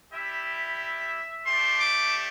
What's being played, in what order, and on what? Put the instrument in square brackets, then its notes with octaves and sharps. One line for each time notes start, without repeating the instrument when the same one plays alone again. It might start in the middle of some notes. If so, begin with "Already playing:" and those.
[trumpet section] G3 E4 G4 E5
A3 D4 G4 C6
D6